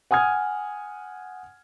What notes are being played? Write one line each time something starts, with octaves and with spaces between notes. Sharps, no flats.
F#5 G#5 D#6 F6 G#6